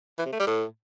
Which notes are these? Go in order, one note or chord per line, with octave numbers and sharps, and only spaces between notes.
E3
C3
A3
G3
A2